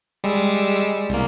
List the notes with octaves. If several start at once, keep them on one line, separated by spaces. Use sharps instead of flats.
G3 G#3 E6
C2 A#3